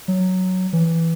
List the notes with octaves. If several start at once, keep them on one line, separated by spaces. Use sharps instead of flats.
F#3
E3